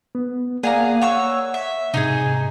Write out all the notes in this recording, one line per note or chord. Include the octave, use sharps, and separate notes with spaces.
B3
A#3 G#4 D5 F5 F#5 A#5
C#5 F#5 C#6 E6
E5
G#2 C3 D#4 G4 G#4